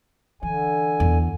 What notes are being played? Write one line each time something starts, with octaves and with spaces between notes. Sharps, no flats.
D3 E3 G#5
E2